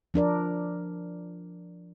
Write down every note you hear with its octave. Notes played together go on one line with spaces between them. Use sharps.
F3 D4 A#4 D5